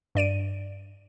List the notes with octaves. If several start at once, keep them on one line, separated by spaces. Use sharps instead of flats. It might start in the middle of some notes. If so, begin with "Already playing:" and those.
G2 D5 D7 D#7